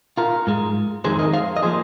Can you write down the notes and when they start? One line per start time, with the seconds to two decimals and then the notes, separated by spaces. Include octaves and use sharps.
0.17 F4 A#4
0.47 G#2 G#3
1.04 F2 D#3 G#3 G#4 C5
1.19 A#4 D#5
1.33 C5 F5
1.57 D#5
1.62 F3 A#3 G#4 C5